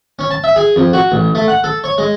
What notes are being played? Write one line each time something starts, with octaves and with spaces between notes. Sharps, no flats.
C#4
A5
E5
G#4
F2
F#4
A1
A3
F#5
A4
C#5
G#3